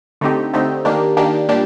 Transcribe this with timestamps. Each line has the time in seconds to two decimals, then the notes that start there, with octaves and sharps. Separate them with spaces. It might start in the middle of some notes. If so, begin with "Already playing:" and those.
0.21 D3 A3 C4 D#4 G4
0.53 D3 A3 C4 D#4 G4
0.85 D#3 A#3 D4 G4
1.17 D#3 A#3 D4 G4
1.49 A#2 G3 D4 G4